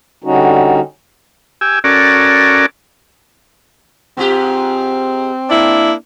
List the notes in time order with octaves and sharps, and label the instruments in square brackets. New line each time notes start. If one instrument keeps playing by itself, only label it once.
[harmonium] D3 G3 C#4 D#4 F#4
[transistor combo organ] G4 G#5 E6
C#4 F#4 A4 A#4 D5
[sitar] G#2 F4 G4 [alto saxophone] C4
[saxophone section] A#3 D4 E4